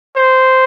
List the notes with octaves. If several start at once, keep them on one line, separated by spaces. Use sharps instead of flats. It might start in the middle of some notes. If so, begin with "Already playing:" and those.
C5